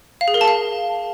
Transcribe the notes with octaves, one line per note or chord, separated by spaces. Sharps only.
F5
G#4
A#4
A5
F5